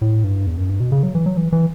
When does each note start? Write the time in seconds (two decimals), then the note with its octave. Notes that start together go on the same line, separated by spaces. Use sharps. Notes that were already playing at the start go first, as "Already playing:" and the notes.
0.01 A2
0.24 G2
0.47 E2
0.58 F#2
0.69 G2
0.80 B2
0.92 C#3
1.03 F#3
1.15 E3
1.26 F#3
1.37 E3
1.52 E3